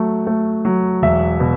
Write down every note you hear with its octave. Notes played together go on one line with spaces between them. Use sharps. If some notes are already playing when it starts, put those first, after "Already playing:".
Already playing: F#3 A3
A3
F#3
E1 E5
B2